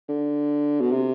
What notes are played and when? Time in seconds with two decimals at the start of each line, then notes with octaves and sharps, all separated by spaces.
0.09 D3
0.81 B2
0.92 C3